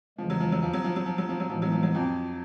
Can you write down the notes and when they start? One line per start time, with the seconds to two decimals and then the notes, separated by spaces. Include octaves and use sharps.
0.18 E2 C#3 E3 F3 G#3
0.30 F#3
0.40 F3
0.52 F#3
0.63 F3
0.73 F#3
0.84 F3
0.96 F#3
1.06 F3
1.18 F#3
1.29 F3
1.40 F#3
1.49 A2 E3 F3 G#3 B3
1.62 F#3
1.72 F3
1.83 F#3
1.95 F2 F3